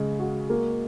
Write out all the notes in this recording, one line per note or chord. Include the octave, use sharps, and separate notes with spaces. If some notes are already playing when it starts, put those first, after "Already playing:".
Already playing: C#3 G#3
F#4
A#3